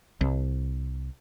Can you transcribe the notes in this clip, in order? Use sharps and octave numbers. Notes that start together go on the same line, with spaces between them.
C2